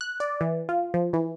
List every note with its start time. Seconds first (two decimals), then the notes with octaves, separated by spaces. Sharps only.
0.01 F#6
0.20 D5
0.41 E3
0.69 F4
0.94 F3
1.13 E3